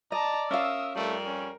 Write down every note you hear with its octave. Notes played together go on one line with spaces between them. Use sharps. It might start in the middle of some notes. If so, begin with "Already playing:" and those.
D5 D#5 A5 A#5
C#4 F4 A#4 E5 F5 D#6 E6
F2 G3 A3 A#4
C#4